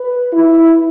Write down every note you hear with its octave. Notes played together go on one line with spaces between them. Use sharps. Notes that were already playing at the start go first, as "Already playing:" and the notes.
Already playing: B4
E4